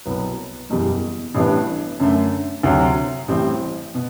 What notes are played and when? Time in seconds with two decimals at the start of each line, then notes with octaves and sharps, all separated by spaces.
0.06 C2 B2 F#3 B3
0.70 F#1 E2 B2 G3
1.35 A1 A2 G3 B3 D4
2.00 F#2 D3 A3
2.63 D2 C3 F#3
3.28 A1 A2 G3 C4
3.95 B2